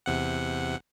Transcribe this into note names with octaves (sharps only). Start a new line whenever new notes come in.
E2 C3 F#5